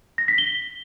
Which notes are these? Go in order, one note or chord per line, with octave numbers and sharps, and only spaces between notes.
A#6
B6
G7